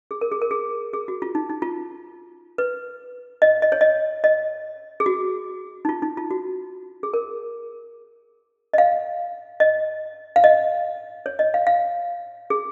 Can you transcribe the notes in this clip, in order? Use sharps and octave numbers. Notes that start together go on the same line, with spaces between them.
G#4
A#4
G#4
A#4
G#4
G#4
F#4
F4
D#4
D#4
F4
B4
D#5
D#5
C#5
D#5
D#5
G#4
F#4
D#4
F4
D#4
F4
F#4
G#4
A#4
D#5
F5
D#5
F5
D#5
C#5
D#5
F5
F5
G#4